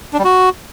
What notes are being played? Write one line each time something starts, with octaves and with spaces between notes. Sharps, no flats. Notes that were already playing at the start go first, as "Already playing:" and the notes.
D4
G3
F#4